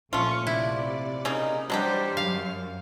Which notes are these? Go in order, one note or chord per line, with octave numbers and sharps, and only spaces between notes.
A#1 A3 C#4 F4 C#6
C3 E4 D5
C#3 A#3 D#4
E3 F#3 G3 D4 G4 C5
F#2 F5